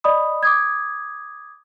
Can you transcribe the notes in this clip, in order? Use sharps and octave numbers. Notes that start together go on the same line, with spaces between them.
D5 D#5 B5 D#6
D6 D#6 G#6